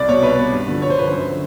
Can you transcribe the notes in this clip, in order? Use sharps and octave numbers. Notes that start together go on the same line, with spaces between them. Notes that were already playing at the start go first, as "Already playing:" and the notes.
Already playing: C2 D5
B2 C#5
C2 B4
B2
G2
D3 F3
G2 C#5
C5
D3 F3 B4
F#2 C5
D3 F3